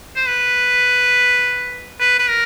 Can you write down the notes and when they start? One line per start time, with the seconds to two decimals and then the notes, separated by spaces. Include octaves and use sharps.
0.15 C5
0.27 B4
2.00 B4
2.19 B4
2.30 A#4